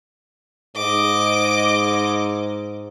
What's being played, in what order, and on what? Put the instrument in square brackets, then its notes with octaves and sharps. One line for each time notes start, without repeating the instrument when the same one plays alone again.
[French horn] G#2 [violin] D#5 D6